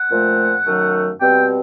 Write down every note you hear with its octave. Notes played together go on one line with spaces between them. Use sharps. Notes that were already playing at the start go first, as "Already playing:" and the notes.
Already playing: F#5
A#2 F3 A3 C4
F#2 D#3 F#3 A3
B2 G3 C4 G5